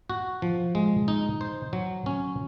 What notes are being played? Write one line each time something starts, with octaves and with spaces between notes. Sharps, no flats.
F#4
F3
G#3
D#4
C5
F#3
C#4